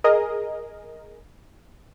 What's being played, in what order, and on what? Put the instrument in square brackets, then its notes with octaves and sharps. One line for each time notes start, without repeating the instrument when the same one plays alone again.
[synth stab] G#4 A#4 D#5